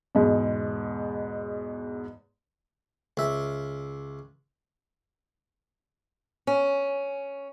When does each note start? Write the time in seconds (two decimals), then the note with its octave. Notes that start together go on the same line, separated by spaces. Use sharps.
0.15 E2 G#2 B2
3.17 C#2 E5
6.47 C#4